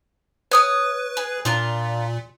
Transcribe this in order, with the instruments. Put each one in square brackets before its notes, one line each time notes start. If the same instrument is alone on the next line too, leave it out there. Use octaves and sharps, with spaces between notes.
[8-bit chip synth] B4 [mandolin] C#5 D#6 F6
[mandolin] G#4
[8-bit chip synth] A#2 [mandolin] D4 F4 A#4